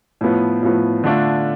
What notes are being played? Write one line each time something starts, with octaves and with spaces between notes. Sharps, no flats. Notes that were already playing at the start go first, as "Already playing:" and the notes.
A2 F3 B3
A2 F3 B3
D3 A3 D4 F4